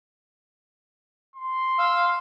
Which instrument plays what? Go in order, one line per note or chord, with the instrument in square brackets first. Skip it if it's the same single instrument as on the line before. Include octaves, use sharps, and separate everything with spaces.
[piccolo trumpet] C6
[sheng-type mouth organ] F5 E6